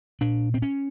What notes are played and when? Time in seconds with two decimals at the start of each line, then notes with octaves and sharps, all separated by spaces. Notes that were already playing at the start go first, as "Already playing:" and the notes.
0.21 A#2 D4
0.54 C4
0.62 C#4